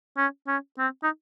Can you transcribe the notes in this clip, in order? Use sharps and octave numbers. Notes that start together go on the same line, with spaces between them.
C#4
C#4
C4
D#4